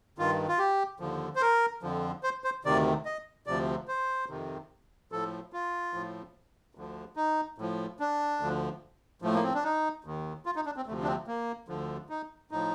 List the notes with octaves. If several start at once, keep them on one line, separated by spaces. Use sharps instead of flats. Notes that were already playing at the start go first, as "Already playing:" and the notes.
G2 D#3 F4
F4
G4
D#2 D3 F3
C5
A#4
F2 D3 F3
C5
C5
D2 C3 D#3 D5
D#5
D2 C3 F3 D5
C5
F2 C3 D#3
A2 F3 A4
F4
A2 F3
D2 D3 F3
D#4
A2 F3
D4
D2 D3 F3
A2 F3 A3
A#3
C4
D4
D#4
D#2 D#3
F4
D#4
D4
C4
D2 C3 F3 A3
D4
C4
A#3
D2 D3 F3
D#4
A2 F3 D#4